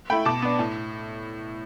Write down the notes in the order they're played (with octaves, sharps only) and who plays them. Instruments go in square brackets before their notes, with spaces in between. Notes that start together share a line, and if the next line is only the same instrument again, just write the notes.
[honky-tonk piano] A3 E4 G5 B5
B2 A5 D6
B3 D4
A2